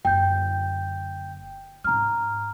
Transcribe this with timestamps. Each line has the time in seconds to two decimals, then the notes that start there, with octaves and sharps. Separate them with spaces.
0.05 F#1 D3 G5 G6
1.84 G#2 C#4 A#5 F6